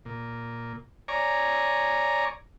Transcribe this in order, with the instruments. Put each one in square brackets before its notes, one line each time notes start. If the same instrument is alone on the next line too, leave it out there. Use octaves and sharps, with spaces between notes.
[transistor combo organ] A#2
C#5 D5 G#5 A#5